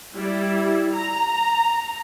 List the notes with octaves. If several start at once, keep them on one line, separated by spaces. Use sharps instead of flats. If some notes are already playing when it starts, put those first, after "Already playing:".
G3 E4
A#5